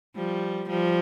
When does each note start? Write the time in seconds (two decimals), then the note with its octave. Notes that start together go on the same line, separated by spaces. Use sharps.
0.16 F3 G3
0.69 F3 G3